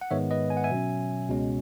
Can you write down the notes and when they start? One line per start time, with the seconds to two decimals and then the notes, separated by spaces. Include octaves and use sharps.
0.01 F#5
0.11 G#2 D#3 G#3 B3 C#5 E5
0.31 B4 D#5
0.50 G#5
0.57 F#5
0.64 E5 G#5
0.70 B2 F#3 C#4
1.29 C#2 B2 G#3 C#4